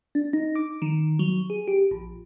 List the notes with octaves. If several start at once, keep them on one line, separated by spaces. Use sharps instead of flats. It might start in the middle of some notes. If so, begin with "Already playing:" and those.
D4
D#4
D6
D#3
F#3
G#4
G4
A#1